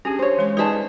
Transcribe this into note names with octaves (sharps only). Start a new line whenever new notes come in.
C#4 D4 G4 G#4
C5 C#5
E3 G#3 C6
D#4 G#4 B4 D5 A5